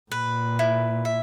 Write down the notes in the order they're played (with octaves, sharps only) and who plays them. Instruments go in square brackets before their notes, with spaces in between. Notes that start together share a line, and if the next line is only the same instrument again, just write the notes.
[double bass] A#2 [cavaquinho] B4
[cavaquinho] E4
E5